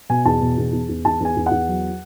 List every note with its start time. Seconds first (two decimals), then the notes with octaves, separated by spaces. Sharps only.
0.09 B2 G#5
0.25 E2 A5
0.41 B2
0.58 E2
0.73 E2
0.89 E2
1.05 E2 A5
1.20 E2 G#5
1.36 E2
1.46 F#5
1.51 E2
1.68 F#3